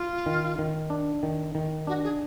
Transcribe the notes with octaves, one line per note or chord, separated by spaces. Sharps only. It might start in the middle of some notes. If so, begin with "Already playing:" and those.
Already playing: F4
D#3
D#3
D4
D#3
D#3
D4 F#4
G#4